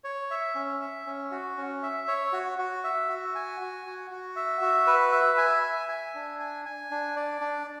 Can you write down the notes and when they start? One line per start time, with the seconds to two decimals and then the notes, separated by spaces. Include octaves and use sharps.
0.04 C#5
0.31 E5
0.55 C#4
0.81 E5
1.06 C#4
1.31 F#4
1.57 C#4
1.83 E5
2.08 C#5
2.33 F#4
2.58 F#4
2.84 E5
3.09 F#4
3.35 G#5
3.61 F#4
3.86 F#4
4.11 F#4
4.36 E5
4.61 F#4
4.87 B4
5.12 E5
5.38 G#5
5.63 E5
5.89 G#5
6.15 D4
6.39 G#5
6.65 G#5
6.91 D4
7.16 D5
7.41 D4